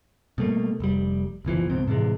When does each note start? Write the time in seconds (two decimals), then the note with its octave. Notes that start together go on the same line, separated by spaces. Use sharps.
0.38 B2 G3 A3 A#3
0.80 F1 G3
1.45 F#1 B2 E3 F3
1.69 C#2 G#2 B2 C4
1.88 A2 C3 E3 G#3